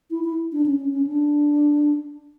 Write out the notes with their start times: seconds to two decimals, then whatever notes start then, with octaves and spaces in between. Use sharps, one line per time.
0.11 E4
0.24 E4
0.52 D4
0.66 C#4
0.80 C#4
0.93 C#4
1.07 D4